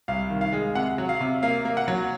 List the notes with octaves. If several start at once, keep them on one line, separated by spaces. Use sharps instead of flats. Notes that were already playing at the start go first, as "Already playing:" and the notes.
C2 F5
D#3
F5
G#3
C3 F#5
F#3
F5
C3
A#3 F5
A#3
F#5
F#3